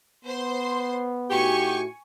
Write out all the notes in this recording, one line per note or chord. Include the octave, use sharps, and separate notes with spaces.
B3 C5 C6
A2 D#4 F#4 G4 G#5 C#6